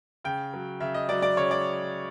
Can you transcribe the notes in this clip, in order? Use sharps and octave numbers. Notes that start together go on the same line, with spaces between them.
C#3 G5
F#3
C#3 E5
D#5
F#3 D5
D5
C#3 C#5
D5